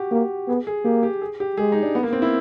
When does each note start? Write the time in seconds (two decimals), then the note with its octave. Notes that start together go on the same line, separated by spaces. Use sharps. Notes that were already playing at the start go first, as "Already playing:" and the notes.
Already playing: F#4 G4
0.11 A#3 G4
0.48 B3 G#4
0.67 G#4
0.85 A#3 G4
1.03 G4
1.21 G#4
1.40 G4
1.57 G#3 G#4
1.72 D#4
1.83 D4
1.95 B3
2.03 A#3
2.13 C4
2.22 E4